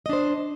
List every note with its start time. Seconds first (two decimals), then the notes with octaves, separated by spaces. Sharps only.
0.06 D#5
0.09 D4
0.13 C5